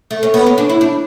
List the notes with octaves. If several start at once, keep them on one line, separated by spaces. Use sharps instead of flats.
A3
C#4
B3
C#4
D4
E4
D4